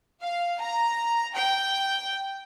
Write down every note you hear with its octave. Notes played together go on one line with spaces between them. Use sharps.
F5
A#5
G5